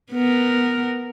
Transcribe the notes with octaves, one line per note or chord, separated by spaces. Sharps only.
B3 A#4